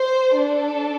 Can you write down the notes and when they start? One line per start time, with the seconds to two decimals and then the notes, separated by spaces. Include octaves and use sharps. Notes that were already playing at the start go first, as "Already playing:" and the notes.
Already playing: C5
0.38 D4 A4